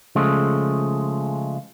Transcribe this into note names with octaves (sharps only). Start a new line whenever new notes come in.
C#3 F3 G#3 A3